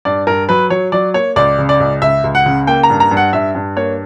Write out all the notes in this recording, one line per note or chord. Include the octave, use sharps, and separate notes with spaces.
G2 D5
G2 A#4
F#3 B4
F#3 C#5
F#3 D5
A#3 C#5
C#2 D5
C#3
D5
C#2
C#2 E5
C#2
F#5
C#3
A#3 G5
A#5
G2
A#5
G2
F#5
G2 E5
G2
A#3 C#5